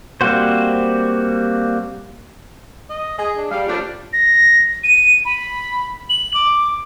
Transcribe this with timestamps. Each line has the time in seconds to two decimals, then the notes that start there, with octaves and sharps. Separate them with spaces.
0.21 G3 A#3 C4 F#4 C5
2.90 D#5
3.18 G#4 D#5
3.37 D4
3.51 G3 F5
3.68 F3 G3 A3 C#4 D4 D5
4.13 A#6
4.84 D#7
5.25 B5
6.10 F#7
6.34 D6